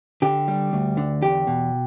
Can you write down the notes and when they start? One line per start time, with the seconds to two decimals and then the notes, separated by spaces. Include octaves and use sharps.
0.22 D3 G4
0.48 G3
0.73 D2
0.97 D3
1.22 E2 G4
1.47 B2